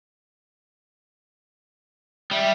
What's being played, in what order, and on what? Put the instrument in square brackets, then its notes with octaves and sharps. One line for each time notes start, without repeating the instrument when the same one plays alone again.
[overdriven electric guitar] G3 [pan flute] E5